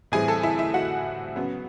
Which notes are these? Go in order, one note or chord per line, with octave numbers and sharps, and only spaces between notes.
A2 E3 G3 C4 G#4 G#5
A4 A5
E4 E5
E4 E5
F#4 F#5
C#3 F#3 B3